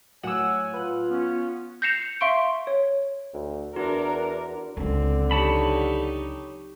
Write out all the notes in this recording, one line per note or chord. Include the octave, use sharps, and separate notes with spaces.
A2 F#3 C#5 F#5 G#5 E6
F4 B4 F#6
B3 C#4
G6 A#6 C7 C#7 E7 F7
E5 F5 C6 C#6 D7
C#5
D2
E2 D4 F#4 A#4
C#2 D3 F#3 C4
D#4 G4 C#5 A5 B5